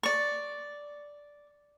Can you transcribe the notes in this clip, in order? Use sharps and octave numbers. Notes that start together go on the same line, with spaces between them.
D5 C#6